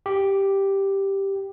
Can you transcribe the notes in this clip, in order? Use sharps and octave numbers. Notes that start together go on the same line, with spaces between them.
G4